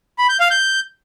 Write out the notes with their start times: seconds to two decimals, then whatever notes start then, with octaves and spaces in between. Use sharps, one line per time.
0.18 B5
0.29 G6
0.40 F5
0.51 G6